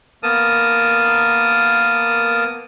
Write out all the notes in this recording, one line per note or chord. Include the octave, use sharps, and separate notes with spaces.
A#3 B3 A#4 A5 D#6